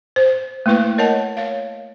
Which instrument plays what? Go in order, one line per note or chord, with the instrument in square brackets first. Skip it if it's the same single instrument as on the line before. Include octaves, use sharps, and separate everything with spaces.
[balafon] C5
A3 A#3 E4 B4 C#6
A#4 C#5 D#5 F#5 A5
C#5 F5